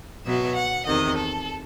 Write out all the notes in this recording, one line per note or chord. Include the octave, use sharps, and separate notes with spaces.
B2 F#3 B3 E5
F#5
E2 C3 D#3 D#5
A4